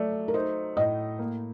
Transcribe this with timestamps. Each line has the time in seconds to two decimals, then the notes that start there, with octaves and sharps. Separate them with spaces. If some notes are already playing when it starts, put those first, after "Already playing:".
Already playing: F#3 A3 D5
0.28 A#4
0.34 D#4 C5
0.77 A2 D#5
1.19 A#3